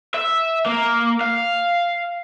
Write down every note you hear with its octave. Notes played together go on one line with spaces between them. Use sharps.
E5
A#3
F5